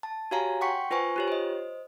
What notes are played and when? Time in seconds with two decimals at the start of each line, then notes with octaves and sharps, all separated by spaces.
0.03 A5
0.31 F#4 G4 C#5 F5 G#5 A#5
0.61 F#5 G5 C6 C#6 B6 C#7
0.91 F4 B4 C5 G#5 C#6
1.16 F4 G4 C#5
1.28 C5 D#5